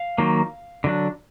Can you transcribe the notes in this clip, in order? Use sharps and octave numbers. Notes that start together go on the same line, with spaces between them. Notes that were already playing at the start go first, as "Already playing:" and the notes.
Already playing: F5
D#3 F#3 A#3
D3 F#3 D4